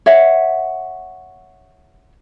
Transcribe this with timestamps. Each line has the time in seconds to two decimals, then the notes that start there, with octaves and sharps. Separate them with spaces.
0.06 C#5 E5 F#5